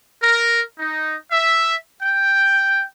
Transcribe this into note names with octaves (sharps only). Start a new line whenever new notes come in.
A#4
D#4
E5
G5